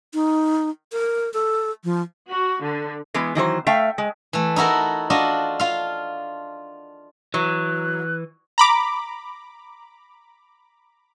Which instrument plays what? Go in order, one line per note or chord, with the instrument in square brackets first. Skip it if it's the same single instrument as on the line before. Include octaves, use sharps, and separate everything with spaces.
[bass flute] D#4
A#4
A4
F3
[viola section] F#4
D3
[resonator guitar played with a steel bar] E3 G#3 B3
D#3 E3 F#3 C5
A3 E5 F5 G5
G#3
[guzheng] E3 A3
D#4 E4 F#4 A4 A#4
D4 F4 F#4 A4 D#5
F4 F5
[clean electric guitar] E3 [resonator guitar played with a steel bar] F#3 [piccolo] F#6
[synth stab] A#5 B5 D6